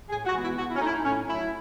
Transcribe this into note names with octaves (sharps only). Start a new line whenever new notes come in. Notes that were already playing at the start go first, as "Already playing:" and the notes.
A2 G#4
F#4
E3 G#3 B3
E4
B2 F#4
E4
C#4
A3 D#4
E4
D#4
A2 C#4
F#3 A3 E4